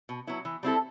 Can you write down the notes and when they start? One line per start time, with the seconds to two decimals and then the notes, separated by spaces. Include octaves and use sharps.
0.09 B2
0.27 F#3 B3 E4
0.45 E3
0.63 G3 C4 E4 A4